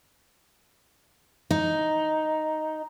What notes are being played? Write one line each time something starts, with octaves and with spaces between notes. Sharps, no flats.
D#4